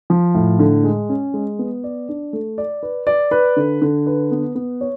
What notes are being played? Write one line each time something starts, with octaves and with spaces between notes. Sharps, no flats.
F3
A2
D3
G#3
C#4
G#3
B3
D5
D4
A3
D5
B4
D5
B4
D3
D3
B4
B3
B3
C#5